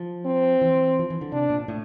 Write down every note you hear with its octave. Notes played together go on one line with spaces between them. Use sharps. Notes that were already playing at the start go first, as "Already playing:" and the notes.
Already playing: F3
C4
E3
F3
E3
D3
C3 D4
A#2
A2